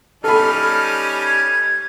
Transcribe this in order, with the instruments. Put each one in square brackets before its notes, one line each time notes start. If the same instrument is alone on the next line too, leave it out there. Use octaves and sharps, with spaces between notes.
[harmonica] G3 C#4 D#4 [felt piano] A4 B5 [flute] F6
[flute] G#6